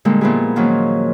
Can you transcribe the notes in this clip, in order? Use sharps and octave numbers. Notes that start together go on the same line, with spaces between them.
A#2 D3 G3 G#3 A#3
A#2 F3 B3 E4 G4 G#4
D#3 F3 F#3 A#3 C#4